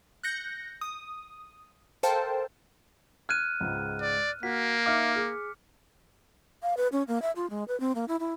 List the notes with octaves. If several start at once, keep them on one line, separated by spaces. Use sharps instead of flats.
F#6 G6 A#6 C#7
D#6
A4 A#4 C5 F5 G5 A5
F6 F#6 G#6 D#7
C#2 G#2
D5
A#3 F#4 B6
D#4 E5 F5 D6 F6 C#7
G#4
F5
B4
C#4
A#3
E5
F4
G#3
B4
C4
A#3
E4
E4